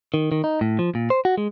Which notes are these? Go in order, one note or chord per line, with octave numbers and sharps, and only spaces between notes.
D#3
D#3
D#4
A2
F3
A#2
C5
F#4
G#3